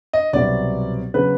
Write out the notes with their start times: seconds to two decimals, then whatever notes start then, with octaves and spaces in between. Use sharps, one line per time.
0.13 D#5
0.33 C2 B2 F#3 B3 D5
1.14 C#3 F#3 B3 B4